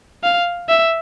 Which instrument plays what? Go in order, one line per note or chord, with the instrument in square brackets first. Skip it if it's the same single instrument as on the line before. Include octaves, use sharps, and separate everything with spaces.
[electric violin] F5
E5